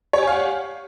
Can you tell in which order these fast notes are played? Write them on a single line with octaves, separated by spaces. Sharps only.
C#5 G4 G#5 F5 F#5